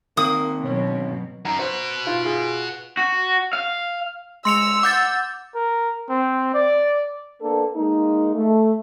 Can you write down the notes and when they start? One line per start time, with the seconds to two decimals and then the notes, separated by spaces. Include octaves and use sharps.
0.17 D#3 A#3 C4 D#6
0.65 B2 F#3 C#4
1.45 F#2 A#5
1.59 F#4 B4 C5
2.07 F4
2.25 F4 G#4
2.97 F#4
3.53 F5
4.45 G#3 C6 E6 C#7 F7
4.83 F#5 D6 G6 A6
5.54 A#4
6.09 C4
6.54 D5
7.41 A#3 B3 D4 A4
7.75 G#3 A#3 D#4
8.35 A3